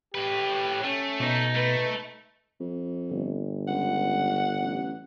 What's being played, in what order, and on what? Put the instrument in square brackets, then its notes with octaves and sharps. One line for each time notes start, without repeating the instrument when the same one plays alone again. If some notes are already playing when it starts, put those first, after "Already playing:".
[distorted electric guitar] A2 B4 [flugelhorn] G4
[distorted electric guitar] A3 [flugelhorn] C#4
[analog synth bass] B2 [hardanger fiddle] D#4
[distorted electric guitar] A3 [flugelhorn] B4
[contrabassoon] F2
[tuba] G1
[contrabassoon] C#2 [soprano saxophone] F#5
[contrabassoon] A1